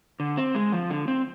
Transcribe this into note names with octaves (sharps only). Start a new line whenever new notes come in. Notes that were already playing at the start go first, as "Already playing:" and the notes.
D3
C4
G#3
F3
D3
C4